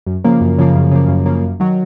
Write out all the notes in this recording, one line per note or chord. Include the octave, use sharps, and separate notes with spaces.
F#2
C#3 F3 A#3
F#2
C#3 F3 A#3
F#2
C#3 F3 A#3
F#2
C#3 F3 A#3
F#2
D#3 F#3